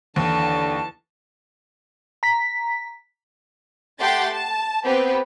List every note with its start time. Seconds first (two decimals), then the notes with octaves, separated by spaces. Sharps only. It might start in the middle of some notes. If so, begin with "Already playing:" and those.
0.16 D#2 D3 E3 A5
2.23 A#5 B6
4.01 A3 G4 F#5 G5 C6 A6
4.32 A5
4.84 B3 C4 G4 B4